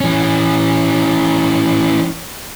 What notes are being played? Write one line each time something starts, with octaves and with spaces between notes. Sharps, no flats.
E3 C#4